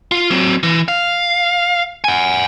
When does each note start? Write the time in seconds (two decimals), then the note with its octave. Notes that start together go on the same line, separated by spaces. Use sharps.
0.12 F4
0.31 F#3 C4
0.63 E3
0.88 F5
2.04 F#5 G#5